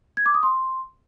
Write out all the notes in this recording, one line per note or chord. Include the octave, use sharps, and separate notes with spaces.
G#6
D6
D#6
C6